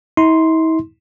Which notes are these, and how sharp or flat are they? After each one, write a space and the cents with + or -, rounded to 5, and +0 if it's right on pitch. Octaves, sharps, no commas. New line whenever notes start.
E4 -45 C6 +0